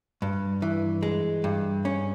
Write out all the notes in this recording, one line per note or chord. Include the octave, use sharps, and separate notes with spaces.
G2
E3
G#3
G2
C#4